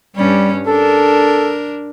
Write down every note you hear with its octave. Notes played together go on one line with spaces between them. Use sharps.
G2 G3 C#4
D4 A4 A#4